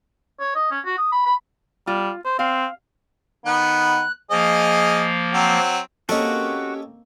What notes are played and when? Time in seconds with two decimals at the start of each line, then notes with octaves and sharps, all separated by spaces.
0.40 C#5
0.55 D#5
0.71 C#4
0.85 F#4
0.98 D#6
1.12 B5
1.26 B5
1.87 G3 F4
2.25 C5
2.39 C4 F5
3.46 D#3 B3 F#6
4.31 F3 A#3 G#4 D#5
5.34 F#3 C4
6.09 A#3 C4 C#4 F#4 G4 A4 C#5 D#5